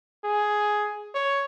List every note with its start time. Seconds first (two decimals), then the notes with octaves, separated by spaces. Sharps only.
0.24 G#4
1.14 C#5